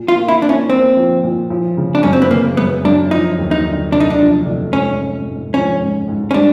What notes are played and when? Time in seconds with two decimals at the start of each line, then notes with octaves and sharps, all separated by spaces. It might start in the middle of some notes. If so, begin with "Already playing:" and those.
Already playing: A#2
0.08 F4
0.15 A#3
0.28 E4
0.42 A#3 D4
0.49 C#4
0.69 A#3 C4
0.96 F3
1.23 A#2
1.50 F3
1.77 C#3
1.95 D4
2.03 F#2 C#4
2.13 C4
2.22 B3
2.30 C#3 A#3
2.57 F#2 B3
2.84 F#2 D4
3.11 F3 D#4
3.38 D#2
3.51 D#4
3.65 D3
3.92 F1 D4
4.00 D#4
4.10 D4
4.19 F3
4.46 F1
4.73 G#2 C#4
5.00 G#2
5.27 G#2
5.54 F3 C#4
5.81 G#2
6.08 G#2
6.31 C#4
6.34 G3 D4